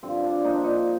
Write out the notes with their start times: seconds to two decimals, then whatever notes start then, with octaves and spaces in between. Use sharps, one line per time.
0.03 G2 D3 F3 C4
0.24 D4
0.44 A#2 F3 D#4
0.53 D4
0.64 D#4